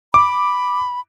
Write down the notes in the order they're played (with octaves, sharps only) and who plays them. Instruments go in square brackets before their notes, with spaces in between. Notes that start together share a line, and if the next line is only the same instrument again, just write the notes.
[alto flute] B5 [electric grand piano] D6